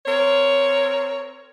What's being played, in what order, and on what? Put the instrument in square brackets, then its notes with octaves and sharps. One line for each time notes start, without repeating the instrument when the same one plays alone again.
[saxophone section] C4 A#4 C#5